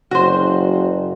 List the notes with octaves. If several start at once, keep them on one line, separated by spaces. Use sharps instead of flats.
F#1 F#4 C5